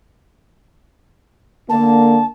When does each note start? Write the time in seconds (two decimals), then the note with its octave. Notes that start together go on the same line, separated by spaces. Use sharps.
1.70 D3 A#3 A5